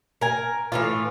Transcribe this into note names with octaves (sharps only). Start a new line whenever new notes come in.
A#4 G#5
A2 E3 F4